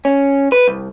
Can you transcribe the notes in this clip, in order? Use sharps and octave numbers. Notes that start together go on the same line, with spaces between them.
C#4
B4
C2